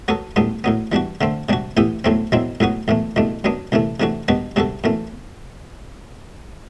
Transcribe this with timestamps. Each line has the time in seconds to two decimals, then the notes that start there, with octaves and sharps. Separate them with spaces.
0.08 F#3 B3 F#4 A4
0.36 B1 A2 G3 B3 D4
0.64 A2 F#3 B3
0.92 E3 G3 D4 F#4
1.21 D3 A3 C4
1.49 C3 G3 D4 F#4
1.77 A2 E3 B3 E4 G4
2.04 B1 A2 F#3 A3 C4
2.32 B1 B2 F#3 C4 E4
2.60 B1 A2 F#3 B3 F#4
2.88 B1 A2 E3 A3
3.16 C2 B2 A3 D4
3.44 F#2 F#3 B3 D4
3.72 C2 C3 E3 A3
4.00 C3 E3 A3 D4 F#4
4.28 B2 G3 D4 F#4 B4
4.56 C3 G3 D4 F#4 A4
4.84 F#2 E3 A3